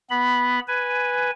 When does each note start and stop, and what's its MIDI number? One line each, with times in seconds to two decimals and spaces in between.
0.10 0.59 59
0.10 0.59 83
0.68 1.31 71
0.68 1.31 80